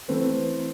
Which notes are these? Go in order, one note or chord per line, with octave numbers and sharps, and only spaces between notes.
E3 A3 C4 B4